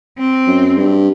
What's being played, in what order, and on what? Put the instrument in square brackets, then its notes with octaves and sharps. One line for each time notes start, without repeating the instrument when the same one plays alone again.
[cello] C4
[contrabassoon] F#2
G2